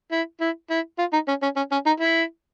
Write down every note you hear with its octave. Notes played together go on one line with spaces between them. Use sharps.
E4
E4
E4
F4
D#4
C#4
C#4
C#4
C#4
D#4
E4